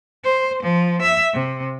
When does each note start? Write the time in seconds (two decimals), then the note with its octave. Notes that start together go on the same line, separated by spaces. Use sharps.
0.24 C5
0.63 F3
1.02 E5
1.33 C3